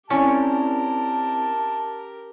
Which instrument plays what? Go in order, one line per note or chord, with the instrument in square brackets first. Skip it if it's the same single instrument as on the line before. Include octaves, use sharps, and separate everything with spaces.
[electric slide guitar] C4 E4 D5 [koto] C#4 [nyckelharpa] G4 A#4 [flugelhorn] A5